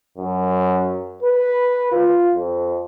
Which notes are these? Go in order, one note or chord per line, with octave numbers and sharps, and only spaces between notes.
F#2
B4
F4
F2